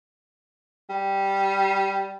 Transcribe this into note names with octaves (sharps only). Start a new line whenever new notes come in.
G3